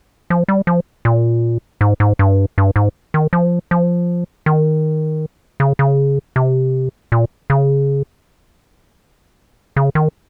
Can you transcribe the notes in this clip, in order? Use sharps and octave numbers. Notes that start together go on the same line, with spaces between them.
F3
G3
F3
A#2
G#2
G#2
G2
G2
G#2
D#3
F3
F3
D#3
C#3
C#3
C3
A#2
C#3
C#3
D#3